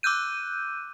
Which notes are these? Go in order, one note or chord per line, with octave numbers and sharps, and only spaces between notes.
D6 E6 F#6 G6 D#7